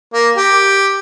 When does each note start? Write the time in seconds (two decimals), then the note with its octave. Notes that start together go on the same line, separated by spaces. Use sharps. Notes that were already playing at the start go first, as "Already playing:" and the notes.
0.13 A#3
0.37 G4